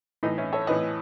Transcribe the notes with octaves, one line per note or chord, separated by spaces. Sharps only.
A2 E3 D#4
C#4 E4
A4 C#5
A2 E3 B4 D#5